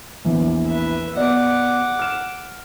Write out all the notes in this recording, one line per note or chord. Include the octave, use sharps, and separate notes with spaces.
A#1 E2 E3
B4 E5
B2 D5 F#5 D6
F6 E7